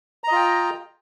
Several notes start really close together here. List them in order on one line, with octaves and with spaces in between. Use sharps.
A#5 D#5 F4 G5